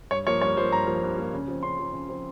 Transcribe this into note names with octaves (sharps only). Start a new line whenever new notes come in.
G2 C#5
F3 A#3 C#5
G2 C#5
F3 A#3 C5
G2 A#5
F3 A#3
G2
F3 A#3
C#3
F3 C4
C#3 C6
F3 C4
C#3
F3 C4